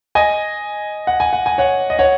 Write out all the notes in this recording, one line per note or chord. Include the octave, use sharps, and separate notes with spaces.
D#5 G#5
F#5
G#5
F#5
G#5
C#5 F#5
D#5
C#5 F#5